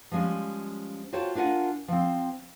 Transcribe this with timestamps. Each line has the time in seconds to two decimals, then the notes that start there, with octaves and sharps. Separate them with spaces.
0.11 F3 G3 G#3 A#3 C#4
1.13 F4 F#4 C5 C#5 G5 A5
1.35 D4 F4 A#4 F#5 G#5
1.88 F3 C4